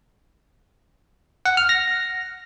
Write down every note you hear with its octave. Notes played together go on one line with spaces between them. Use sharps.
F#5
F6
A#6